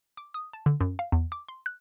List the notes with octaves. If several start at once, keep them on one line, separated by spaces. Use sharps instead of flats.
D6
D#6
A5
D3
F#2
F5
E2
D6
C6
F#6